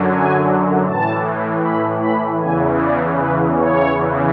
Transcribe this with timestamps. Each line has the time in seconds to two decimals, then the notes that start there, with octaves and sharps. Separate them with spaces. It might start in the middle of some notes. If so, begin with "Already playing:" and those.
Already playing: F#2 D3 F#3
0.08 G#5
0.86 A2 E3 A5
1.63 B5
2.01 B5
2.41 E2 C#3 E3 G#5
2.79 D5
3.18 B4
3.56 C#5
3.95 E2 C#3 E3